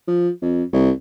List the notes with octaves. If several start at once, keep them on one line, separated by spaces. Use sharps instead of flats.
F3
F2
C2